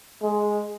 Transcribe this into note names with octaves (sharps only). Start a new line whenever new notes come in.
G#3